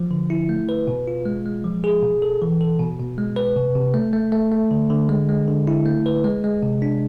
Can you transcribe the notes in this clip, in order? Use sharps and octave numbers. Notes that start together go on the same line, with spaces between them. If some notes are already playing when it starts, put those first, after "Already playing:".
Already playing: F3
D3
E4
A3
B4
B2
F4
G#3
G#3
F3
G#4
B2
A4
E3
A4
B2
B2
G#3
B4
C3
C3
A3
A3
A3
A3
D3
D3
G#3
G#3
D3
E4
A3
B4
G#3
G#3
C3
D4